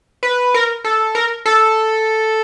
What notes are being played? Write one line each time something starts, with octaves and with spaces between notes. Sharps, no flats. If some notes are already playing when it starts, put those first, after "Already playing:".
B4
A#4
A4
A#4
A4